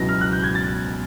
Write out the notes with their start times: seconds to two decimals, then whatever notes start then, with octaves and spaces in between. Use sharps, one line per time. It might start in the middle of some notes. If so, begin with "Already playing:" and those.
Already playing: C#2 B2 F#3 B3 E4 A#6
0.09 F6
0.21 F#6
0.33 G6
0.43 G#6
0.55 A6